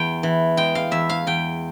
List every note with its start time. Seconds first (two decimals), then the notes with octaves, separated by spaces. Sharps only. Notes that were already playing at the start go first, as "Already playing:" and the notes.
Already playing: E2 G5
0.23 E3
0.57 G#3 G5
0.75 F5
0.91 E2 E5
1.09 F5
1.27 E2 G5